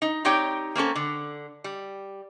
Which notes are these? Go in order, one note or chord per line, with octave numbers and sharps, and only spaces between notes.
D#4
C4 D#4 G4 C#5 D5 G5
A#3 C4 C#4 A4
D3
G3